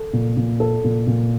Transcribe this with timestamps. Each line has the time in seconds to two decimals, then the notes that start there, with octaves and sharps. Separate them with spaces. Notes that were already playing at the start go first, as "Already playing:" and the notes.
Already playing: A4
0.13 A#2
0.37 A#2
0.60 A4
0.84 A#2
1.07 A#2